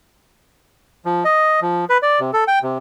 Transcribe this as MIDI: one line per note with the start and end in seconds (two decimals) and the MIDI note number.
1.05 1.24 53
1.24 1.60 75
1.61 1.85 53
1.90 1.98 71
2.03 2.20 74
2.20 2.31 48
2.33 2.44 69
2.48 2.59 79
2.63 2.78 48